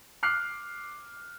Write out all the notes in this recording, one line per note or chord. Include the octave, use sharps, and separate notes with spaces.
D6 F6 F#6 C7